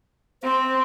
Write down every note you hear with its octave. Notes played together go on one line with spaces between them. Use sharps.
C4 C5